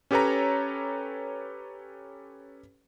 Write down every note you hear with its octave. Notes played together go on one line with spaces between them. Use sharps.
C#4 G4 A4 B4 C#5 A#5